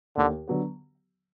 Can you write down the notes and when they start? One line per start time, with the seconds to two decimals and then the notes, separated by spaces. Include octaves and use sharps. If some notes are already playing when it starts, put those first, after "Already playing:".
0.17 D#2 D3
0.48 D3 F#3 B3